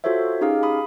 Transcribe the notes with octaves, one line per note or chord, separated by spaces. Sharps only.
F4 F#4 A4 C5 C#5 E5
C#4 D#4 G4 G#4 F5
B5 D#6